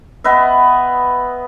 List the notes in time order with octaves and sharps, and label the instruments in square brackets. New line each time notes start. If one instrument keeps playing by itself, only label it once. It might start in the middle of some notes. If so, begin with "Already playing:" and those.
[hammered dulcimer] B3 B4 D#5 E5